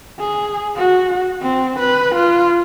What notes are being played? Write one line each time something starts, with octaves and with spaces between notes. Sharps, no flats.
G#4
F#4
C4
B4
F4